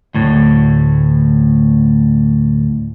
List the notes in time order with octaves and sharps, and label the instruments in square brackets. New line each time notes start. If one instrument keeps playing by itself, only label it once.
[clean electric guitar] D2 A2